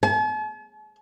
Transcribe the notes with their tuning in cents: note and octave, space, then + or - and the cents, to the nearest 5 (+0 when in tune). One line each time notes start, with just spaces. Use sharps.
A5 -45